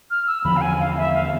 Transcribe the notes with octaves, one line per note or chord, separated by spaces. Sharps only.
F6
E6
E2 D3 F3 B5
F5
G#5
F5
E5
F5